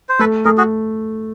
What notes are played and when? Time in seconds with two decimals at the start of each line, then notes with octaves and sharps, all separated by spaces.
0.09 C5
0.19 A3 A4 B4
0.45 A3 G#4 A#4
0.57 F#4 G#4